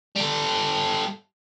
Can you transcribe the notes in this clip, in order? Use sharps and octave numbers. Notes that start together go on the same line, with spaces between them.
G3 A4